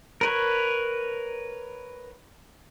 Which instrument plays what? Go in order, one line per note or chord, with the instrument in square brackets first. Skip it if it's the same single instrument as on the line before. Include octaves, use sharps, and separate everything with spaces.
[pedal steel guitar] A#4 B4 C#5